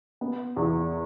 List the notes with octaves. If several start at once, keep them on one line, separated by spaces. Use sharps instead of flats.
B3
E2